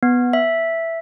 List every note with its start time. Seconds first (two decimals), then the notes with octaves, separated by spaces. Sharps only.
0.03 B3
0.33 E5